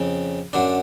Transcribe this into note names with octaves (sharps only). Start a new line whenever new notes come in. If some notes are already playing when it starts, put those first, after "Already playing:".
Already playing: F2 C#3
F#2 D3 D4